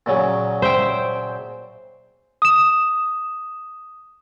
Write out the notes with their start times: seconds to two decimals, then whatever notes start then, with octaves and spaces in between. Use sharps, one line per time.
0.06 A#2 C#3 F#3
0.62 C5 E5 G5
2.42 D#6 E7